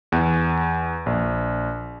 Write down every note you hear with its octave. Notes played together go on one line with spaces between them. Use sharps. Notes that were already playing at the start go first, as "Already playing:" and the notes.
E2
A#1